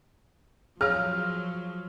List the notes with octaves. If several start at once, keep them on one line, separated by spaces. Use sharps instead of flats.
F3 F#3 G#4 C#5 F5 F6